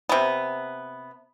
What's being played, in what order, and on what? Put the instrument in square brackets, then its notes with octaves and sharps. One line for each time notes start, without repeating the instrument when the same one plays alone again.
[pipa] C3 B3